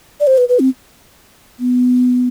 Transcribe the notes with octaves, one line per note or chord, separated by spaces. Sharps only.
D5
C5
B4
B4
C4
B3